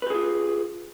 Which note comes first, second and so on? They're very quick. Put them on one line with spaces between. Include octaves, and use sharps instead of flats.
B4 G4 G#4 F4